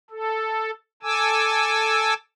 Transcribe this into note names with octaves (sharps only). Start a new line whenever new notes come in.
A4
A4 G#5 D6 E6